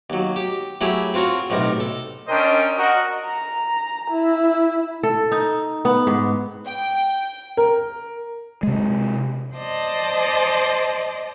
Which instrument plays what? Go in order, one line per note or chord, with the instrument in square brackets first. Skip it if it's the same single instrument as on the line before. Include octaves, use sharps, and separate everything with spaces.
[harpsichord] D#2 F#3
G4
F#3 A3 E4 G4 G#4
C4 F4 F#4 A#4 C#5
B1 A2 C3 D#4 A#4
A4
[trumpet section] C#4 D4 A#4 C5 D#5 G5
F#4 A#4 D#5
[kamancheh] A#5
E4
[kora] A4
D#4
B3
G#2
[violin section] G5
[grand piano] A#4
[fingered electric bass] C3 G#3
[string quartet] C5 D5 D#5 A5